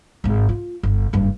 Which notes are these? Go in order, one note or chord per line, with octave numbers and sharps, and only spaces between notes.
G#1 G#2
F4
G1
F#1 G2